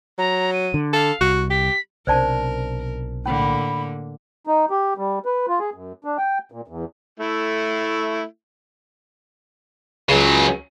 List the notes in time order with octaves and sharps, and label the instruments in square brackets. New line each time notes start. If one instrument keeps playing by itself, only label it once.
[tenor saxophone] F#3 [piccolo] A#5
[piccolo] D#7
[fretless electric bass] D3
[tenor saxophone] A4 [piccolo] F5
[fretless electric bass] C2 [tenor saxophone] F#4
[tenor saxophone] G4 [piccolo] B6
[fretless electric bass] B1 C3 D4 [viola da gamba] A#4 [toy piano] C5 D5 A5
[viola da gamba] A2 D3 A#3 [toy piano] C#4 [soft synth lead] B5
[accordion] D#4
G4
G3
B4
F4
G#4
F#2
D4
G5
A#2
E2
[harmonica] A3 E4
[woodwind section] C#2 [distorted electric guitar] C#3 F#3